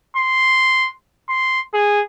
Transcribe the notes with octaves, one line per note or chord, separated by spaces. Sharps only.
C6
C6
G#4